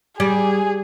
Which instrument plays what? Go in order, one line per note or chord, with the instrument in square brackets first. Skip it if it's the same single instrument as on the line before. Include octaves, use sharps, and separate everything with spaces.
[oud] G3 [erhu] G#4